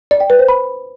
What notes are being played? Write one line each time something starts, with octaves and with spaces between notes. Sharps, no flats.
D5
G5
B4
C5
B5